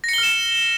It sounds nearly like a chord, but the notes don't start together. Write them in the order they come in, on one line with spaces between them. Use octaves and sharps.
A#6 C#7 G7 F6 E7